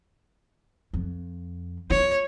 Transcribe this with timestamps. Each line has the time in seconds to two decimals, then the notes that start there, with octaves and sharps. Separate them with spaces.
0.93 F2
1.90 F4 C#5